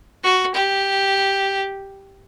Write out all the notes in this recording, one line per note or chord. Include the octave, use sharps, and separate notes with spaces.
F#4
G4